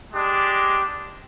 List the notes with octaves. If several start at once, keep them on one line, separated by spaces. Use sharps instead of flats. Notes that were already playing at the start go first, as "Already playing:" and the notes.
G#3 D4 G4